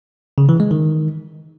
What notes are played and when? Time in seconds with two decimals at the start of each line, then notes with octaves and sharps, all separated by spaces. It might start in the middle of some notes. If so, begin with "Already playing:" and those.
0.38 C#3
0.49 E3
0.60 G#3
0.71 D#3